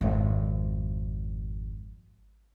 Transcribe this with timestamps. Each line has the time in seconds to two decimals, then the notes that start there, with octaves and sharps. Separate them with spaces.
0.01 G#1 F2